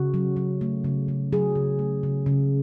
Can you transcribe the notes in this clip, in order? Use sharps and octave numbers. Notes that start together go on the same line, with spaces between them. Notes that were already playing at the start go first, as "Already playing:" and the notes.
Already playing: C#3 F#4
F#3
F#3
A3
C#3
C#3
F#3 G#4
C#3
A3
C#3
C#3